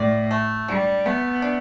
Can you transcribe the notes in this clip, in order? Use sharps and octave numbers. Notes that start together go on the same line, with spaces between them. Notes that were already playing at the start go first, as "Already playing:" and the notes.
Already playing: A2 D5
A3
G3 D4
A3 B3
D4